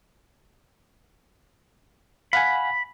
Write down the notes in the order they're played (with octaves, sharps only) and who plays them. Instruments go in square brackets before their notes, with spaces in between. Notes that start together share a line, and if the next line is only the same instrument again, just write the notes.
[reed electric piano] F5 F#5 G#5 [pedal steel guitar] B5